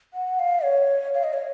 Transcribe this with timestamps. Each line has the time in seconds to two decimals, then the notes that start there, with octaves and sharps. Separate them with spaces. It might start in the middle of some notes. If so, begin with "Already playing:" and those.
0.14 F#5
0.39 F5
0.64 C#5
1.14 F5
1.24 D#5
1.33 C#5